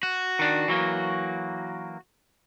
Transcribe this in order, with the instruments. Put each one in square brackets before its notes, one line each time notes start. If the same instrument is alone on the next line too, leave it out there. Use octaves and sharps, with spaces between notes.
[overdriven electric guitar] F#4
[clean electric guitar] D#3 D4
E3 F#3 A#3